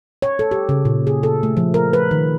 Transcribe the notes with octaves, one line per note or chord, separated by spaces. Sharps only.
C#5
A4
G4
C#3
A#2
G#4
A4
A3
F3
A#4
B4
D#3